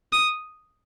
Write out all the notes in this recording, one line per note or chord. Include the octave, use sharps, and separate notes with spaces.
D#6